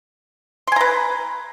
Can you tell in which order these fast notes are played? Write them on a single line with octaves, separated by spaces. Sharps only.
C6 G#5 A#5 B4